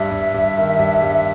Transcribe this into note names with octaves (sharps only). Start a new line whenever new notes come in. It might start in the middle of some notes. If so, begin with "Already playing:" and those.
Already playing: G2 E5
G2
G2
D#3
G2
G2